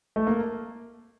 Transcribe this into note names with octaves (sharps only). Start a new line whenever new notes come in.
A3
A#3